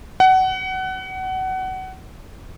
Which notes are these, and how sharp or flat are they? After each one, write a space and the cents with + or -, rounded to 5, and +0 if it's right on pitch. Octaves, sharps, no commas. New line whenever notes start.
F#5 +25